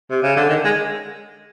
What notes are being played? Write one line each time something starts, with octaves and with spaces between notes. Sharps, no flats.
C3
C#3
D3
D#3
G#3